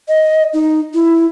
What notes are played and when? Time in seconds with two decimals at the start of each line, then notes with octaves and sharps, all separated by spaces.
0.08 D#5
0.53 D#4
0.94 E4